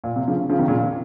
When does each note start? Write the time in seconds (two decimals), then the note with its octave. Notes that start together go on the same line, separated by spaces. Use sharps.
0.04 A#2
0.16 C3
0.27 C#3 F3
0.49 C#3 F3
0.59 C3 D#3
0.68 A#2 C#3